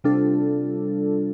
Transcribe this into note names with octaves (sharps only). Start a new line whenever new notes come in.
C3 G3 D4 F4 A4